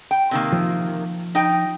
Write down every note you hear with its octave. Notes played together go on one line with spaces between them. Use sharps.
G5
C3 D#3 A#3
F3
D#4 G5